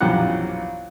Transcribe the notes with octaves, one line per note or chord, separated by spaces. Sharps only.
A#1 F#2 B2 E3 G4 F#5